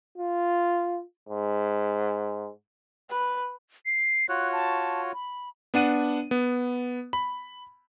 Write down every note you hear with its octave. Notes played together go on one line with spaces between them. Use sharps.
F4
G#2
B4
C7
F4 F#4 C#5 F#6
A5
B5
B3 D4 F#5 D#7
B3
B5